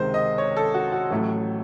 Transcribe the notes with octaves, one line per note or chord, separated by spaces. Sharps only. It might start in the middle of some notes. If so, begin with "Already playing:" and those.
Already playing: C#2 C3 D#3 G#3 C5
D#5
C#5
A4
F#4
F#4
A1 A2 F#3 A3